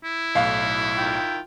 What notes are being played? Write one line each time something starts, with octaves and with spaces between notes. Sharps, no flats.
E4
B1 A2 F5
D#3 F4 G5